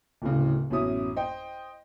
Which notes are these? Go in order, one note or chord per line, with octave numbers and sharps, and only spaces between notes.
D1 A2 C#3
A1 F#2 B2 C#4 E5 D#6
C5 D#5 G5